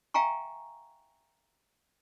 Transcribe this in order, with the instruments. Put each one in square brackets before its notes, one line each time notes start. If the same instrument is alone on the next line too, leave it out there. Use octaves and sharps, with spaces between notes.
[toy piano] E5 F5 G5 G#5 A#5 C#6